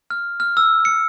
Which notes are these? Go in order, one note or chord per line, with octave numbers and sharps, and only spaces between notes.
F6
F6
E6
C#7